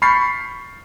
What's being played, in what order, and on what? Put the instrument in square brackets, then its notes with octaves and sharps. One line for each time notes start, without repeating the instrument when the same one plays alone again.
[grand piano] B5 C#6 F6 G6 A6 C7